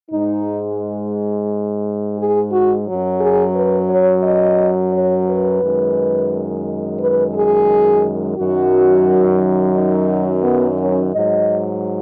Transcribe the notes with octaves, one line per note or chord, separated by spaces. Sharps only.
G#2 G#3 D#4
G#4
F#4
F#2 F#3
G#4
B4
C#5
D#5
C#5
B4
F#2 D#3 G#3
B4
G#4
F#2 D#3 F#3 F#4
D#4
B3
C#4
G#2 F#3 D#5